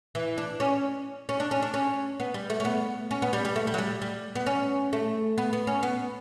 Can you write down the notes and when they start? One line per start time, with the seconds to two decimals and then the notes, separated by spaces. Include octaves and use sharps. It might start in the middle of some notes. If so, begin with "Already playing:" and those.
0.15 E3
0.38 D4
0.60 C#4
1.29 C#4
1.40 D4
1.51 C#4
1.62 D4
1.74 C#4
2.20 B3
2.34 G3
2.50 A3
2.60 C#4
2.65 B3
3.11 C#4
3.22 B3
3.33 G3
3.45 G3
3.56 A3
3.67 G3
3.74 F#3
3.78 G3
4.02 G3
4.35 B3
4.46 C#4
4.93 A3
5.38 B3
5.53 B3
5.67 C#4
5.83 B3